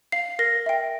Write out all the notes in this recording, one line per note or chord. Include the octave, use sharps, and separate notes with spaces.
F5 C7
A#4 A#6
E5 G5